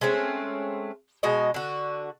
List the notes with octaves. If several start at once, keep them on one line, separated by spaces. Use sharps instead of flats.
G#3 A3 C4 C#4
B2 G#3 F#4 D#5
D3 F#4